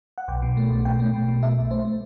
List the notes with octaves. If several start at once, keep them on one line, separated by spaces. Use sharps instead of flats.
F#5
B1 G5
B2
A3
B1
B2 G5
A3
B2
B2
A3 E5
B1
A3 C5
A3